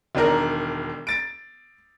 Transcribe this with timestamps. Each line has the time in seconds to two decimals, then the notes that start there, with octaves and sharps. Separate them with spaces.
0.15 E1 D#3 D4 A#4
1.07 A6 D7